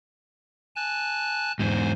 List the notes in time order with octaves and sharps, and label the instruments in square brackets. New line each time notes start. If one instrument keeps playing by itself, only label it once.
[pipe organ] G#5 A5 F#6
[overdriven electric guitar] E2 G#2 [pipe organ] C5 G#5